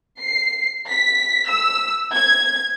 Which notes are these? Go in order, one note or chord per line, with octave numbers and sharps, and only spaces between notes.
C7
B6
E6
G#6